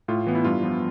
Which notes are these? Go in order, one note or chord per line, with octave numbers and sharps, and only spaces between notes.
A2 F4
E3 B3
E4
G2 F4
F3 B3